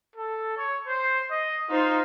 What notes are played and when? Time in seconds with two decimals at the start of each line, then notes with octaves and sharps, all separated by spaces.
0.16 A4
0.58 C#5
0.87 C5
1.31 D#5
1.70 D#4 F4 C5